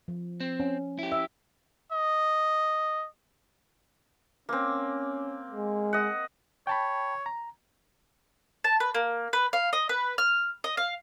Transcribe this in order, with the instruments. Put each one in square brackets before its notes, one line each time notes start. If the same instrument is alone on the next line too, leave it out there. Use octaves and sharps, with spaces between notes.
[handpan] F3
[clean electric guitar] C4
[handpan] C#4
[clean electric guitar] E4 G4
[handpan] E5
[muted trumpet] D#5
[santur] A#3 C4 [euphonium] C#4
[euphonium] G#3
[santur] D#5 F#5
[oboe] C#5 [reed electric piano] G5 A5 B5
[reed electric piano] A#5
[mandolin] A5
B4
A#3
B4
F5
D#5
B4
F6
D#5
F5